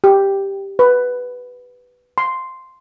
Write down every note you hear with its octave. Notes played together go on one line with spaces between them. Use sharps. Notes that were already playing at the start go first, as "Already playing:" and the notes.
G4
B4
C6